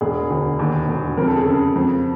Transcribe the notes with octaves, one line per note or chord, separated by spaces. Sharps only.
E1 G#4
D2
D#2
E1
F2 A#4
A4
G#4
C#3 A4
F2